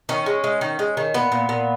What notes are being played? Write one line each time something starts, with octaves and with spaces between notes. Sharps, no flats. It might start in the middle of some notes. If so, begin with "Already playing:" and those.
D#3 C#4
G#3
G#3
D#3
G#3
D#3
A#2 B3
A#2
A#2